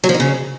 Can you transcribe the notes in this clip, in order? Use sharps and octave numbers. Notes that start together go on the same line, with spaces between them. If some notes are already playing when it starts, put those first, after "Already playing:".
F#3
F3
D#4
C#3